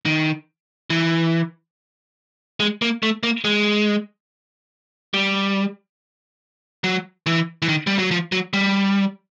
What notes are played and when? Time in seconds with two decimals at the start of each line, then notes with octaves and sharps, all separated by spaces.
0.06 D#3
0.90 E3
2.60 G#3
2.82 A#3
3.03 A3
3.23 A#3
3.45 G#3
5.14 G3
6.84 F#3
7.26 E3
7.62 E3
7.69 D#3
7.87 G3
7.98 F#3
8.11 F3
8.32 F#3
8.53 G3